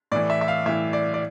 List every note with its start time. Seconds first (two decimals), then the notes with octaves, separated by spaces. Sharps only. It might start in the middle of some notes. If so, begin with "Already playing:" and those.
0.12 A2 E3 D5
0.30 E5
0.41 E5
0.48 F5
0.66 A2 E3 E5
0.93 D5
1.14 D5